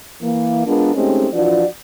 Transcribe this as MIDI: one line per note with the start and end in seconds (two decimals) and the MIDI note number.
0.22 0.64 52
0.22 0.64 58
0.66 0.94 56
0.66 0.94 59
0.66 0.94 62
0.66 0.94 65
0.66 0.94 70
0.95 1.26 56
0.95 1.26 57
0.95 1.26 60
0.95 1.26 61
0.95 1.26 63
0.95 1.26 67
1.33 1.64 52
1.33 1.64 53
1.33 1.64 62
1.33 1.64 65
1.33 1.64 66
1.33 1.64 74